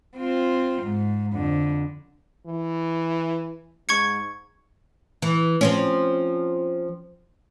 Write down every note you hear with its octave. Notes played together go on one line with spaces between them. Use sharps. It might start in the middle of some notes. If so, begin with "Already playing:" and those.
C4 F4
G#2
F2 D3
E3
G#2 C#6 G#6 C#7
E3
F3 C4 C#4